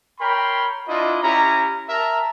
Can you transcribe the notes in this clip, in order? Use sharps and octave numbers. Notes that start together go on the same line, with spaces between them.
A#4 C#5 G5 B5 C6
D4 E4 F4 D#5
C#4 E4 G4 A#5
A#4 E5 A5 A#5